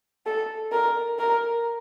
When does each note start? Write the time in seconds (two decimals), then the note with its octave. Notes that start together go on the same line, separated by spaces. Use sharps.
0.26 A4
0.72 A#4
1.19 A#4